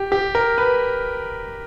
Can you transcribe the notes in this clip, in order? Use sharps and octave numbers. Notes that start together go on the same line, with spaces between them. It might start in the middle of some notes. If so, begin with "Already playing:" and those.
Already playing: G4
G4
A#4
B4